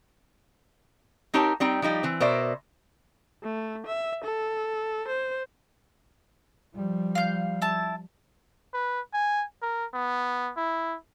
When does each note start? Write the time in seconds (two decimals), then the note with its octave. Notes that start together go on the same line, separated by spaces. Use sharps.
1.34 C4 D#4 G4 A#4 C#5 A5
1.60 G3 C4 D#4 G5
1.82 F3 G3 D#4 G4
2.03 E3 C4
2.20 B2 A#4 C5 D5 E5
3.43 A3
3.86 E5
4.24 A4
5.08 C5
6.74 F3 G3
7.15 F5 G6
7.62 E4 A5
8.74 B4
9.13 G#5
9.62 A#4
9.94 B3
10.57 E4